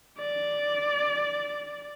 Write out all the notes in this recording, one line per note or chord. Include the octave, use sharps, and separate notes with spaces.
D5